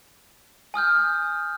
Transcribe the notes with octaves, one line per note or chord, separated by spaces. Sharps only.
G#5 D#6 F6 G6